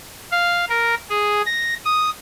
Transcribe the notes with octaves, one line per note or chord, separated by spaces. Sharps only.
F5
A#4
G#4
A#6
D#6